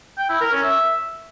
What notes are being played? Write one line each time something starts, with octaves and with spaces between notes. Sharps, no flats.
G5
E4
A#4
C#4
E5